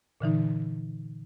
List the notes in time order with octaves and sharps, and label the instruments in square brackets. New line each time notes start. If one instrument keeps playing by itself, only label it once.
[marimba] A#2 D3 E3 D#4